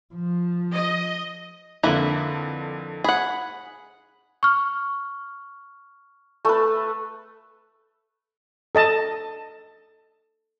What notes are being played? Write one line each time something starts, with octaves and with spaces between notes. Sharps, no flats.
F3
D#5
F2 D3 A#3 E4 B4
G#4 F#5 B5
C#6 F6
A3 B4
A4 D#5 A5